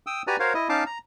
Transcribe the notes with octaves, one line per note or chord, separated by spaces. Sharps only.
G5 D#6 E6
F#4 G4 B4 D5 G#5 A#5
F#4 A#4 C5 C#5 F5
E4 D#5
C#4 D#4 F5 A5 D6
A#5